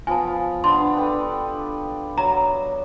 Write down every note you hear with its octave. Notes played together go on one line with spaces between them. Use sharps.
F3 B3 F4 G#5 A5
B3 D4 C6
G4 A4 B4
F#3 A#5